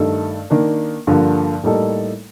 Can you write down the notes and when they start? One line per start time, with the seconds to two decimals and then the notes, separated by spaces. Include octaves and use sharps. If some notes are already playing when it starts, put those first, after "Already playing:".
Already playing: G2 D#3 A3 D#4 A4
0.50 D#3 A#3 D4
1.07 G2 D3 F3 A#3
1.63 A2 G3 A#3 D#4 A4